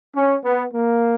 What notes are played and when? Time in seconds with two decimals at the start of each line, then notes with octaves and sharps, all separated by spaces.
0.16 C#4
0.44 B3
0.74 A#3